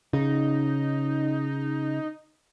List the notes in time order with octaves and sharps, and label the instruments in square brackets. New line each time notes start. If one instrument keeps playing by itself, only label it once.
[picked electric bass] C#3 [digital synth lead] D#4